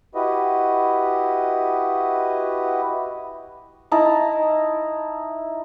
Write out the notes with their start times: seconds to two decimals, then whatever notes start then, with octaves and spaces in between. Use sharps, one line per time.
0.15 E4 F#4 G4 B4 D#5
3.91 D#4 E4 A5 A#5